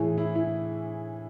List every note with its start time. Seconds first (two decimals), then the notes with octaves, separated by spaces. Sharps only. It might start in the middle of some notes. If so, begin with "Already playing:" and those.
Already playing: A2 E3 G#4
0.18 E4
0.35 E4